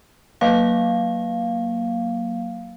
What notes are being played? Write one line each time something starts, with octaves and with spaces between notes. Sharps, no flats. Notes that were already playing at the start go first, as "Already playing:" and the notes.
F#3 A#3 F5